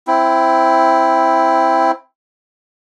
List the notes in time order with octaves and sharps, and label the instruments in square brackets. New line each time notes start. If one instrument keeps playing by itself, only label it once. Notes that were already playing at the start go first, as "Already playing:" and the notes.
[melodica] C4 E4